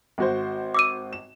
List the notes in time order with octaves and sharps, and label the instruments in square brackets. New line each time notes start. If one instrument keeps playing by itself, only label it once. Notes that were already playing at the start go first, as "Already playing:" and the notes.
[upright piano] G#1 F#4 C5
[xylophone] D6 E6 D#7
[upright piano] E7